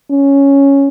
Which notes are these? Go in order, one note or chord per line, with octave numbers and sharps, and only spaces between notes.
C#4